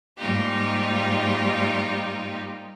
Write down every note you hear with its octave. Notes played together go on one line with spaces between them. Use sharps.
G#2 G3 A#3 D#4 F4 G4